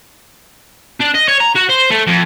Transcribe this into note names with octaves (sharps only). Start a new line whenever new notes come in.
D4
D#5
C#5
A#5
F#4
C5
A3
F2